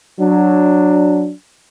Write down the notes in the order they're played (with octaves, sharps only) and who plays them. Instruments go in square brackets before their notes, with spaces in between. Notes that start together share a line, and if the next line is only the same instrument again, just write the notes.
[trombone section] F#3 D4